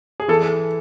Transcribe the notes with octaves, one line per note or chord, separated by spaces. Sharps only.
G#4
E3 A4